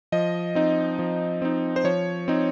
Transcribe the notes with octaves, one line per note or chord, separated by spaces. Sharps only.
F3 D#5
C4 D#4
F3
C4 D#4
C5
F3 C#5
C4 D#4